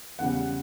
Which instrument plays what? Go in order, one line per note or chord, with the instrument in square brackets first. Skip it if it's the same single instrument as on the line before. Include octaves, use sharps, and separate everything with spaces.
[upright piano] E2 C#3 G3 F#5